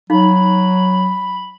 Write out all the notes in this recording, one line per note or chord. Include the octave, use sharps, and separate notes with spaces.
F#3 D#4 F5 B5